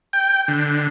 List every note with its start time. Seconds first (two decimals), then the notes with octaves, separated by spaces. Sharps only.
0.13 G5
0.48 D3